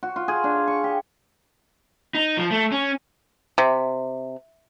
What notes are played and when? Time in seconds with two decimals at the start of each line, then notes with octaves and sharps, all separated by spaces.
0.03 F#4
0.16 F4
0.28 G#4
0.44 D4
0.56 F5
0.68 C#6
0.84 G4
2.15 D#4
2.37 F3
2.51 A3
2.72 C#4
3.58 C3